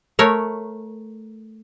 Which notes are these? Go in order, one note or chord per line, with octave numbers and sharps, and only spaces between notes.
A3 A#4 C#5